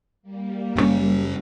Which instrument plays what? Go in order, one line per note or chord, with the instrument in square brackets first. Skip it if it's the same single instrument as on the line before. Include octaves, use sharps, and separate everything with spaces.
[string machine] G3 A#3
[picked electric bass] F#1 A#2 C#4